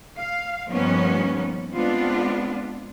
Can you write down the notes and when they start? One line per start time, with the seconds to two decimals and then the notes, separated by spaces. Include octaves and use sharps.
0.19 F5
0.71 G2 D#3 F3 A#3 B3 C#4
1.74 G#3 B3 C4 D4 F4